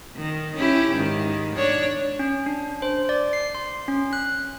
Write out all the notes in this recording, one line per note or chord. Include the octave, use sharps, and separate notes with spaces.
D#3
C#4 E4 G4
G#2 D#3
D4 C#5
C#4
D4
C5
D5
C7
C6
C#4
F#6